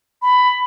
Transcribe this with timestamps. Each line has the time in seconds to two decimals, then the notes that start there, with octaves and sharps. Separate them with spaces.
0.22 B5